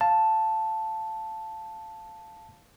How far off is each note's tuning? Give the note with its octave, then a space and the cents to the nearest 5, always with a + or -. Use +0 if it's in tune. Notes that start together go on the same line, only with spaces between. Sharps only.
F5 +0 A5 +0